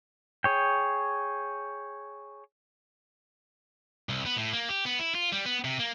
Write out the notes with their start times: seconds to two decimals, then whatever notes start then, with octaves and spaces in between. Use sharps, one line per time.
0.44 G#4 C#5 G5
4.09 C2
4.26 B3
4.38 A2
4.53 A#3
4.69 G4
4.85 B3
4.99 E4
5.15 F4
5.32 G3
5.46 B3
5.64 C3
5.79 A#3